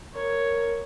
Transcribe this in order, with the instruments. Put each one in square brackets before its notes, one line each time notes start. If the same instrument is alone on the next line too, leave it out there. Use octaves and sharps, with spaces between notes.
[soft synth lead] A#4 [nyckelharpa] C#5